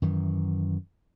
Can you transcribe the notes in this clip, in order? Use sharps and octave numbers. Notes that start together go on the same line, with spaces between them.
F#2 D#3 E3